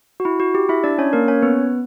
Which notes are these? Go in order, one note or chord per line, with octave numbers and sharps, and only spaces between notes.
F#4
E4
F#4
G4
E4 E5
D4 D5
C#4 C#5
A#3 A#4
C#4 C#5
B3 B4